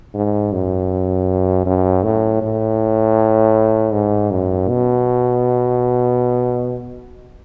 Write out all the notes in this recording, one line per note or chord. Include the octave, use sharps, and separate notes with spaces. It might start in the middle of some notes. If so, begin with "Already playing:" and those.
G#2
F#2
F#2
A2
A2
G#2
F#2
B2